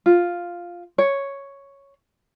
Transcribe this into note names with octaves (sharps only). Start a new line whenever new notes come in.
F4
C#5